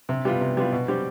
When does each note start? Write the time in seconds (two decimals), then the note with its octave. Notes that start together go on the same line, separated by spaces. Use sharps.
0.09 C3
0.25 G3 B3 F4
0.41 C3
0.57 G3 B3 F4
0.72 B2
0.88 G3 C4 G4